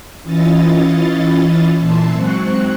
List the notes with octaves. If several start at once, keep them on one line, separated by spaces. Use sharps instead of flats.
E3 C#4 E4 F4 D#5 A6
A#2 E3 E5 A5 C6
G#2 F#3 C4 C#6 F#6